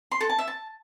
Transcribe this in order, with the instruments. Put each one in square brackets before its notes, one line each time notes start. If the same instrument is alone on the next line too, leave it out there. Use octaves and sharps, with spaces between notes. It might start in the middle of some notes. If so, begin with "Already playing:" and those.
[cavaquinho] C6
A4
A5
E5
A5